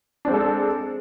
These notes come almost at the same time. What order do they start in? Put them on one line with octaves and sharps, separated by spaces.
D4 C4 G#3 A4